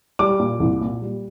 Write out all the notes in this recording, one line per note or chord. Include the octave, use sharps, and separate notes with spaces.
G3 D6
A#2
C2
A#2
G3